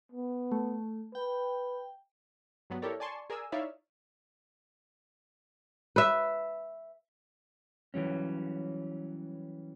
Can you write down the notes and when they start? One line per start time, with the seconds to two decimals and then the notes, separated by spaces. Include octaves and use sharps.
0.12 B3
0.52 A3
1.15 B4 G5
2.70 G2 F#3 B3
2.82 E4 G4 A4 A#4 C#5 D5
3.00 D5 G#5 A5 C6 C#6
3.30 G#4 A#4 D5 G#5 E6
3.52 D#4 E4 C#5 D5 E5 F5
5.96 B4 E5
7.94 E3 F#3 G3 C#4